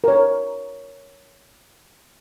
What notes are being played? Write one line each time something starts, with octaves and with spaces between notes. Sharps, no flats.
A#4 C#5